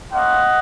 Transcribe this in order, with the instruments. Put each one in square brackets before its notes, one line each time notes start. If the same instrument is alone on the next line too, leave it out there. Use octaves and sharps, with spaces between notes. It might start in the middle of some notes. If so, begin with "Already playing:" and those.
[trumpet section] A#3 C#4 F4 D#5 F#5